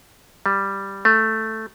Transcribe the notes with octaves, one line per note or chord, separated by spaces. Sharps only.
G3
A3